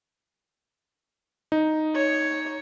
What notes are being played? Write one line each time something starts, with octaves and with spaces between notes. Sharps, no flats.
D#4
C#5